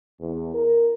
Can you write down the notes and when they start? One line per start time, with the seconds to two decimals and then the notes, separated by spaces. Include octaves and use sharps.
0.20 E2
0.55 A#4